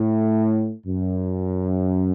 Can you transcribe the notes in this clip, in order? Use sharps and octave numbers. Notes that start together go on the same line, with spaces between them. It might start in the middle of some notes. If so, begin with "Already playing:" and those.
Already playing: A2
F#2